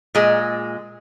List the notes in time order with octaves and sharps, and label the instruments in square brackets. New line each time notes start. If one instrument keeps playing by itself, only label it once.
[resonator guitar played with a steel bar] A#2 G#3